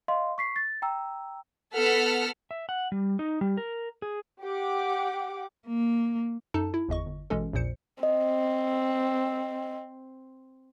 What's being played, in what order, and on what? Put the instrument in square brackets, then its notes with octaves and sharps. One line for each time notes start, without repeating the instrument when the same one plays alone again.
[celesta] D#5 F5 C6
C#6 B6 C7
A6
G5 A#5 E6
[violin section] B3 A4 F#5 F6 B6
[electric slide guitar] E5
F#5
G3
D#4
G3
A#4
G#4
[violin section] G4 F#5 D6
[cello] A#3
[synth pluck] F#2 D#4 A4 A5
E4
G1 E2 D#5 C#6
G1
A1 B2 E3 G#3 C#4 A4
A#1 E2 A#2 C5 C#7
[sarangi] C4 [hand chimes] D#5